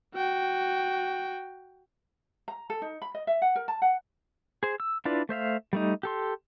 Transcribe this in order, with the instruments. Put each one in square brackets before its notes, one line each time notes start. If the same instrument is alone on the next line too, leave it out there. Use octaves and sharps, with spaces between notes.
[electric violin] F#4 G5
[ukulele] A#5
A4
D#4
B5
D#5
E5
F#5
A#4
A5
F#5
[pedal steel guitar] G#4 C5
E6
D4 E4 F4 B4 D5
A3 C5 E5 F5
G3 A3 D#4
G4 A4 C6